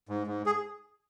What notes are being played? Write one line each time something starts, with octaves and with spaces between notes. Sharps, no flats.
G#2
G#2
G#4